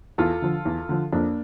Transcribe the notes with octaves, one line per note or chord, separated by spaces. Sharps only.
E2 F4 A4
D3 F3
E2
D3 F3
F2 A#3 D4